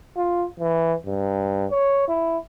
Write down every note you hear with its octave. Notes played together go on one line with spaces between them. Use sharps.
F4
E3
G2
C#5
E4